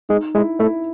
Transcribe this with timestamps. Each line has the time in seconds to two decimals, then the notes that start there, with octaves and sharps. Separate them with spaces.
0.09 G#3 D#4
0.35 G#3 E4
0.59 A3 E4